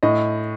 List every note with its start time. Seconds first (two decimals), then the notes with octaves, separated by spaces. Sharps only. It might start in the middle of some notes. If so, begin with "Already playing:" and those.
0.03 A2 D#5